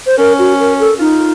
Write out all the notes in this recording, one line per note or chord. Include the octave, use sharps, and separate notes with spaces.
C5
C#4 A#4
F#4
A#4
A4
D#4 F4